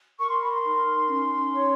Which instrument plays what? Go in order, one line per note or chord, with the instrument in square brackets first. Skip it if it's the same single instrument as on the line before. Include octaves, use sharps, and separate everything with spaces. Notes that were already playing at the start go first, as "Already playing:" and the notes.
[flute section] A#4 C#6
C6
B5
C6
D#4
C#4
C#5